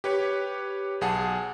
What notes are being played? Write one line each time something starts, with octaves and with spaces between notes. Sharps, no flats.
G4 B4 C#5
B1 G#4 F#5 A5